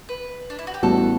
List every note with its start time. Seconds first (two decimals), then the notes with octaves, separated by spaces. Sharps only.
0.09 B4
0.50 D4
0.59 E4
0.67 F#4
0.74 G4
0.83 A1 A2 G3 B3 F#4 A4